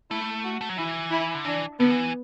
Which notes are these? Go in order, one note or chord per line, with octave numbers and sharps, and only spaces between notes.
A3 E4
F#4
A3
F#3
E3 E4
E4
D3
E3 D4
D3 B3
E3